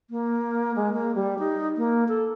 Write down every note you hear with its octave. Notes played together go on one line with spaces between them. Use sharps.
A#3
G#3
A#3
G3
D#4
A#3
A4